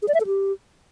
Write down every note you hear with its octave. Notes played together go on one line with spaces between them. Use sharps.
G#4
D5
E5
A4
G4